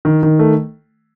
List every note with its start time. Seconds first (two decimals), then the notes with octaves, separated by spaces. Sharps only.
0.05 D#3
0.23 D#3
0.39 A3